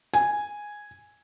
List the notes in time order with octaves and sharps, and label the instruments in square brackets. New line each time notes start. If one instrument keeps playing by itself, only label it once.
[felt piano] G#5